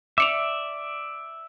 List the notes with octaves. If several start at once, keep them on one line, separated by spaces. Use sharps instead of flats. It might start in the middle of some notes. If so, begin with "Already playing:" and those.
D5 E5 D6 C#7 F7